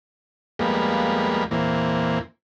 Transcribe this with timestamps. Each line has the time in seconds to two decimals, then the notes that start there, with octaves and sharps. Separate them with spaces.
0.59 F2 G3 G#3 A#3 B3
1.51 E2 A#2 E3 A#3 C4